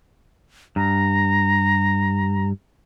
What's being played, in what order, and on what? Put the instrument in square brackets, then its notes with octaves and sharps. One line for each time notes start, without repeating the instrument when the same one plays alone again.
[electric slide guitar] G2 [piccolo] A#5